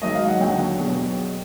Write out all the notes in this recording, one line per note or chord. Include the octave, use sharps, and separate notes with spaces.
G#2 D#3 F#3 D#5
F5
F#5
D#2 D3 F#3 G5
E2 B2 F#3